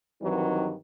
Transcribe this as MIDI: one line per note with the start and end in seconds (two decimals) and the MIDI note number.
0.22 0.73 43
0.22 0.73 51
0.22 0.73 52
0.22 0.73 54
0.22 0.73 60
0.22 0.73 63